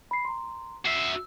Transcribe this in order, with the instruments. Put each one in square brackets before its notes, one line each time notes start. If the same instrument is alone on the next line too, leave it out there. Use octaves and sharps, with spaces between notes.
[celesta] B5 C7
A#5 C6
[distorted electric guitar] F#4 E5 [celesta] C7
[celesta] E6